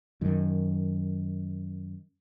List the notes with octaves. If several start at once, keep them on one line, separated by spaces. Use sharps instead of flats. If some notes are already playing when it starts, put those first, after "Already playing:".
F#2 D#3